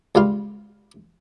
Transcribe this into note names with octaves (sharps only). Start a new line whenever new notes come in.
C#2 G3 F4 F5